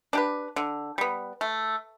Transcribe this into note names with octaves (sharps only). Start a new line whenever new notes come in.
D4 G4 B4
D3
G3 B3
A3